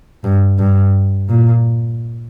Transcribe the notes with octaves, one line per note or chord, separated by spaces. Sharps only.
G2
G2
A#2